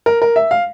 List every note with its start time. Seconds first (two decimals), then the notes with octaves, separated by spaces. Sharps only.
0.06 A#4
0.22 A#4
0.36 E5
0.51 F5